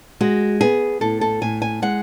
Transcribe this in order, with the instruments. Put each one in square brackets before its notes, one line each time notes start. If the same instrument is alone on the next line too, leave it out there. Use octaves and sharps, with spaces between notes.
[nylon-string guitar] G#3 F#4
B3 G#4
A2 A4
A4
A2 G#5
G#5
G#3 F#5